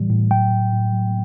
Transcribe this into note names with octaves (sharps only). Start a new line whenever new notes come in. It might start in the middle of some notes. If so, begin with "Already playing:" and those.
Already playing: A2 E3 G3
A2
F#3 G5
A2
A2
F#3